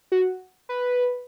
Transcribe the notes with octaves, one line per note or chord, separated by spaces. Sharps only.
F#4
B4